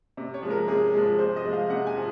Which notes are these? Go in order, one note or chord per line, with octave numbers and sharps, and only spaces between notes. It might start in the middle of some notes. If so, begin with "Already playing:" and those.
C3
C#5
F3 G#3
A#4
C3 G#4
F3 G#3
C3 C5
D#5
F3 G#3
F5
C3 F#5
G#5
F3